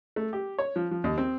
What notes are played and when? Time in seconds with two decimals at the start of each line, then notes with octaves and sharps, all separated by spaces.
0.16 A3
0.33 G4
0.58 C#5
0.76 F3
0.91 F3
1.04 D#2
1.18 C4